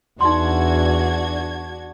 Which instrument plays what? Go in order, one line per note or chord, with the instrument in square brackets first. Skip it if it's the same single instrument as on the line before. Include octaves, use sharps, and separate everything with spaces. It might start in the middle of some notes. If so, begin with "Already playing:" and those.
[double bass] E2 [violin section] D4 F#4 G#6 [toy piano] D#4 C6